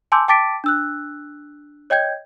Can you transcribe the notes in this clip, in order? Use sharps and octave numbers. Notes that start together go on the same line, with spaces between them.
G#5 A5 C6 D6 E6 G6
G5 A5 D6 A6 B6 D7
D4 E6 F#6
C#5 D#5 G5 G6 G#6